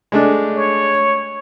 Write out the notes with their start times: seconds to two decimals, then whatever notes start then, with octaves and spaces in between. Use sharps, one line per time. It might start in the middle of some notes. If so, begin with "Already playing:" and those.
0.12 G#3 A3 D4
0.57 C#5